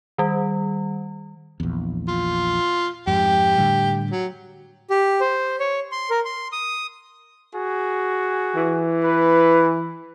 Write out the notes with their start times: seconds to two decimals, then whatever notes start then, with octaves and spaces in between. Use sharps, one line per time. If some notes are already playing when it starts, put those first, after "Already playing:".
0.18 D#3 G3
1.60 A#1 E2
2.08 F4
3.07 F2 G#2 G4
3.58 A2 D3 G3
4.11 F#3
4.90 G4
5.21 C5
5.60 C#5
5.92 C6
6.10 A#4
6.25 C6
6.52 D#6
7.54 F#4 G#4
8.56 E3
9.04 B4